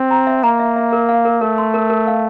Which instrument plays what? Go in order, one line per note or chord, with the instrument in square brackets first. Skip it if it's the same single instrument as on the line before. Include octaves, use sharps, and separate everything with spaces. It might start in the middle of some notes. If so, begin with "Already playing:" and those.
Already playing: [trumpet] C4
[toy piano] A#5
E5
[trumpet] A#3 [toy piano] A#5
[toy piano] E5
E5
A#4
F5
A#4
[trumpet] A3 [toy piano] A#4
[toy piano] C6
A#4
A#4
F5